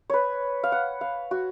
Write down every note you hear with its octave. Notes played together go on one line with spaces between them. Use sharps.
B4 C#5
F5
F#5
F5
F#4